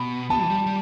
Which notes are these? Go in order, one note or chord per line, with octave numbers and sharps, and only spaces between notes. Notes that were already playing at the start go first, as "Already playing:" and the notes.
Already playing: B2 B5
B3 A5
E3
G3
G3